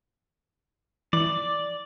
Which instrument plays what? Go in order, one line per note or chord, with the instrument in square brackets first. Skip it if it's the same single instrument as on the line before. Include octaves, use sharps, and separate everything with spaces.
[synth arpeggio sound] E3 [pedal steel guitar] D5